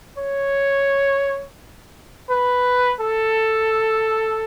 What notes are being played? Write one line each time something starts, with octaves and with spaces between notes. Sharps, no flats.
C#5
B4
A4